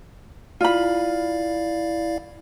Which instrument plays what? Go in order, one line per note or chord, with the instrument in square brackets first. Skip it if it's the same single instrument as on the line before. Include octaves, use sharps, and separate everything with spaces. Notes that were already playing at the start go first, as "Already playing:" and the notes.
[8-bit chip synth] E4 D5 F5 [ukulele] F4 B5